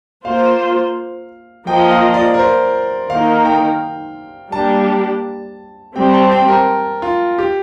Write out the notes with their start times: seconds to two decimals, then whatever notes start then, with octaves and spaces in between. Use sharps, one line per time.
0.24 A#3 F4 C5 F5
1.67 F3 A#3 F4 A#4 D#5 G5
1.91 F5
2.14 D5
2.34 A#4
2.39 C5
3.10 D#3 A#3 D#4 A#4 F5
3.45 G5
4.52 G3 A#3 D4 G4 A5
5.95 G3 C4 G4 G5
6.14 A5
6.31 G5
6.48 A#4
7.02 F4
7.38 G4